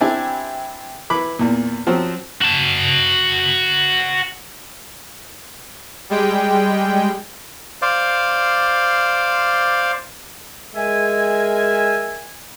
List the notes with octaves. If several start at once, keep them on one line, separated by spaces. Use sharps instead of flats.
C4 D4 E4 G4 G#5
E3 B5 D6
E2 A#2
F3 F#3 C4
F#4 A5
G3 G#3 G5
C5 D5 F5
G#3 A#4 E5 G#5